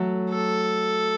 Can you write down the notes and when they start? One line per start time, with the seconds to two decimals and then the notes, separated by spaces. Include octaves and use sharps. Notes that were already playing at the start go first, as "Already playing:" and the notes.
Already playing: F#3 A3
0.30 A4